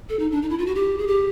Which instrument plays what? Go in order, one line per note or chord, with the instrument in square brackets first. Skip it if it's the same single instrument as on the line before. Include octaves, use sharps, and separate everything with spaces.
[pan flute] A4
D#4
D4
D#4
E4
F4
F#4
G4
G#4
G4